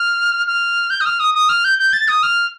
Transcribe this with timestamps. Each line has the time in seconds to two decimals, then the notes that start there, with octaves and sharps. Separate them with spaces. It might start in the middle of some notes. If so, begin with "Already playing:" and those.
Already playing: F6
0.47 F6
0.90 G6
1.01 D#6
1.06 F6
1.20 D#6
1.34 D#6
1.49 F6
1.64 G6
1.79 G6
1.93 A6
2.08 D#6
2.23 F6